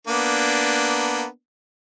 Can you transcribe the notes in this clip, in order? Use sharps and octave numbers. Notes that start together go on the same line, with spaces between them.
A#3 B3 D4